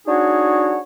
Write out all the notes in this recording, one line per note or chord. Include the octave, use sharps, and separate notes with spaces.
D4 D#4 F#4 G#4 C#5 F#5